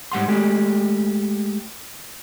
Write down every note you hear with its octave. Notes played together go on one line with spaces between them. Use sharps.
G#2 G3 F#5 C6
G#3 A3 G4